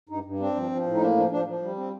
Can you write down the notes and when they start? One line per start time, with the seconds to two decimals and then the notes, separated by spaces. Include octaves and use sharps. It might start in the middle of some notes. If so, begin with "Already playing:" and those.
0.09 G2 D#4
0.24 G2
0.39 C4 D4
0.55 F3
0.71 F3
0.86 A2
0.94 D#4
1.01 A#3 D4
1.16 F3 D4
1.31 F3 D4
1.47 F3
1.62 G3
1.77 C4